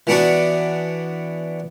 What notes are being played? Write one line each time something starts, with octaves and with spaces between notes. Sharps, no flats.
E3 B3 D4 F#4